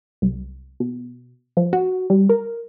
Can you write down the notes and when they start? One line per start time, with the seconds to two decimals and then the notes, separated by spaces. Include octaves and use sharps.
0.22 C2
0.80 B2
1.57 F3
1.73 F#4
2.10 G3
2.29 A#4